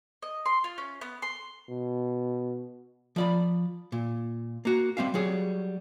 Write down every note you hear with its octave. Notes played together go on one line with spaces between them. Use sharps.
D#5
C6
F4
C#4
B3
C6
B2
F3 D5 B5
A#2
A#3 F#4
G3 C4 E5 F5
F#3 G3 G#4 C#5